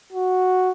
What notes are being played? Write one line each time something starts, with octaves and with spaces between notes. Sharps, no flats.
F#4